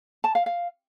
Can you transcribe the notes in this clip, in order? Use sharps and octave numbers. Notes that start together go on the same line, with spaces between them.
A5
F5
F5